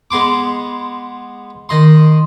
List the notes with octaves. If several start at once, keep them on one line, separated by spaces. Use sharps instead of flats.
G#3 B3 C6 D6
D#3 D#5 C6